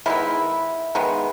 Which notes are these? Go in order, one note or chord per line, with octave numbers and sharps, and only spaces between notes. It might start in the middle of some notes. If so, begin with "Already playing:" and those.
D#3 G#3 B3 E4
D#3 G#3 B3